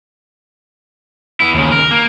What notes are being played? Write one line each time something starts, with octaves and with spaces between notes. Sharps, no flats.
B3 E4
D#2 C#3
A#4
A#3